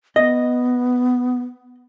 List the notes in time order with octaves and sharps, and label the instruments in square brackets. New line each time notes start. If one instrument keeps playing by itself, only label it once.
[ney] B3 [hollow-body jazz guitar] D#5